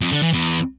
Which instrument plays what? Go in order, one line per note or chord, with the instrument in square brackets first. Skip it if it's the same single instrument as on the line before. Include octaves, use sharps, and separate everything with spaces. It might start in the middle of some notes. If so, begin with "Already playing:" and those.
[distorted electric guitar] F2
D3
E3
E2